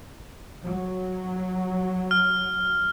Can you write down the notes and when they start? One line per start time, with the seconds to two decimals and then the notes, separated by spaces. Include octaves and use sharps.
0.64 F#3
2.11 F6